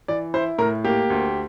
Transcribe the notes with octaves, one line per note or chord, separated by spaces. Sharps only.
E3 D5
E4 C5
A2 A#4
A#3 G4
D2